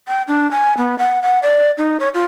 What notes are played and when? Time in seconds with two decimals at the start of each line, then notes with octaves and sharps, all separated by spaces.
0.08 G5
0.28 D4
0.51 G#5
0.77 B3
0.99 F#5
1.22 F#5
1.43 D5
1.78 D#4
2.00 C#5
2.14 F4